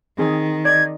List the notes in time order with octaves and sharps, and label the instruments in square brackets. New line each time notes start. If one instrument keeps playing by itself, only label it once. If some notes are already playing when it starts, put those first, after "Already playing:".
[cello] D#3 [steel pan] C4 G#4
[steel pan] D5 D#5 [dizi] G#6